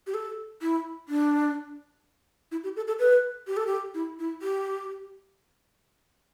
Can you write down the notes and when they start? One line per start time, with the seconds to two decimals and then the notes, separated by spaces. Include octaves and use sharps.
0.07 G4
0.14 A4
0.62 E4
1.09 D4
2.52 E4
2.64 G4
2.76 A4
2.88 A4
3.00 B4
3.47 G4
3.57 A4
3.67 G4
3.95 E4
4.19 E4
4.42 G4